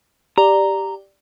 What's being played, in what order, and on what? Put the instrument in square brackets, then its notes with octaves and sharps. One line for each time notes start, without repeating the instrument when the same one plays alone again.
[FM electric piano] G4 D5 [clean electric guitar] A#5